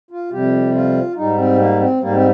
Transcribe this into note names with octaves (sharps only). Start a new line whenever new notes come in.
F4
F2 C3 G3 G4
F4
G#2 G3 D#4
C4
A#3
C4
G#2 G3 A#3
C4